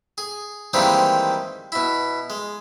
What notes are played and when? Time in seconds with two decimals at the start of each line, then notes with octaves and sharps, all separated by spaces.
0.18 G#4
0.73 D#3 E3 G3 G#3 A#3 C4
1.72 B2 E4
2.30 G#3